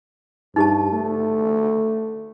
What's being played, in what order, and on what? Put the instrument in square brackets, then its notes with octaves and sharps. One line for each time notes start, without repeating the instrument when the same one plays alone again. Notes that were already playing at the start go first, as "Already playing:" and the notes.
[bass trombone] G2 [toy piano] D#4 G4 A5
[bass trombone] A3